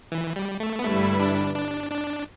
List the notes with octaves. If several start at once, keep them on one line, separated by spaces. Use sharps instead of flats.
E3
G3
A3
B3
G2 D3 G3 A3 E4 B4
D4
D4
D4